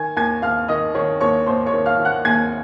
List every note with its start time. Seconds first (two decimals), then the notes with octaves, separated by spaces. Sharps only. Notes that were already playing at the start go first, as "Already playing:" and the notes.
Already playing: D#3 G#5 G#6
0.16 D#2 G#5 G#6
0.42 D#2 F5 F6
0.68 D#3 D#5 D#6
0.95 D#3 C#5 C#6
1.21 D#2 C#5 C#6
1.46 D#2 C5 C6
1.66 C#5 C#6
1.73 D#3
1.86 F5 F6
1.99 D#3
2.05 F#5 F#6
2.25 D#2 G#5 G#6